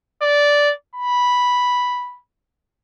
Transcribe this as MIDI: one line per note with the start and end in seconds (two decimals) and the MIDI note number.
0.22 0.72 74
0.95 2.19 83